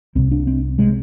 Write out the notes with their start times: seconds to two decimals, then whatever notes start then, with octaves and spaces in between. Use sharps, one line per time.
0.15 C2 C3 C4
0.32 D4
0.47 C4
0.78 C3 G#3